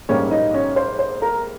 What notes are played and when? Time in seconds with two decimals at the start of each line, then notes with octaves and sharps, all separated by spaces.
0.09 A#1 G#2 G3 A#3 C#4 C#5
0.31 D#4 D#5
0.54 C#4 C#5
0.76 C5
0.99 C5
1.22 A#4 A#5